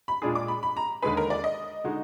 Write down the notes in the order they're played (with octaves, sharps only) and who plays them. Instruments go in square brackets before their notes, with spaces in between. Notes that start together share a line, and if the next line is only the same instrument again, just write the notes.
[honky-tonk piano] B5
[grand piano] A#2 G#3 D4 F4 G#4
[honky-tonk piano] D6
B5
B5
A#5
[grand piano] D#2 D3 G#3 D#4 G#4 [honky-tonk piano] B4
[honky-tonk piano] A#4
D5
D#5
[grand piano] D3 G#3 D#4 F#4